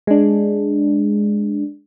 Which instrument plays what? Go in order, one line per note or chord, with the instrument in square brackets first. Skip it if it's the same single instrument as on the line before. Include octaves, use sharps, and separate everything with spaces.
[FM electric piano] G#3 D4